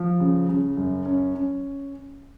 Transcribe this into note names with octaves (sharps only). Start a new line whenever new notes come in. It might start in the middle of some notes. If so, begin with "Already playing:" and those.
Already playing: F3
C#3
C#3
F#2
C#4
C#4